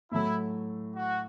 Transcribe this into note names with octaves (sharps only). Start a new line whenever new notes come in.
A2 F#3 A3 E4
F#4